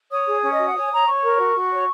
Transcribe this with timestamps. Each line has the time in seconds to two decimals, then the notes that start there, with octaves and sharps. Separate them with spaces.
0.11 C#5 D#6
0.27 G#4
0.43 C#4
0.52 D#5
0.59 F#4
0.65 F#5
0.75 C#5 G#5
0.91 C#5 A#5
1.07 C#5 C#6
1.22 A#4
1.39 F#4
1.55 F#4
1.71 C#5